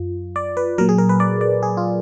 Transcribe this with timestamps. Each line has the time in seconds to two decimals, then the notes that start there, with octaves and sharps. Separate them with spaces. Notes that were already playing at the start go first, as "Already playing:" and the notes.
Already playing: F#2 F4
0.36 D5
0.57 B4
0.78 A#2 F#3 A#4
0.89 G#4
0.98 A#4
1.09 B4
1.20 D5
1.41 D5
1.63 G#4
1.77 F4